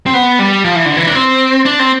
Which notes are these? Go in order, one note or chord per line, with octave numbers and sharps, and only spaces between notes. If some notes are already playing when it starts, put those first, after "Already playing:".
C4
B3
G3
F3
E3
D3
E3
D4
C4
D4
C4